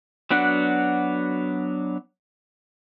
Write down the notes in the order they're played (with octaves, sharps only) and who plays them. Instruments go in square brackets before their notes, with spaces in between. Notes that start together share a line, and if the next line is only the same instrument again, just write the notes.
[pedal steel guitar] F#3 B3 D4 F#4 F#5